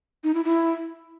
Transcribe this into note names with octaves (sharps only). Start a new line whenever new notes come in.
D#4
E4
E4